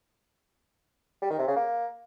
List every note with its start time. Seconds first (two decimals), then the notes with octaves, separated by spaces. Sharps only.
1.22 G3
1.30 D#3
1.39 C3
1.48 C#3
1.56 A#3